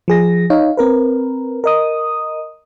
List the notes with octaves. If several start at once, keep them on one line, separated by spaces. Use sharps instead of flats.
F3 G#4 A#6
D#4 C#5 F5
C4 A#4 B4
A#4 D#5 D#6